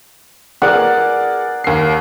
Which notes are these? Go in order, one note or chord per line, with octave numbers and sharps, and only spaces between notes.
G#4 A#4 D5 F#5
D#2 C7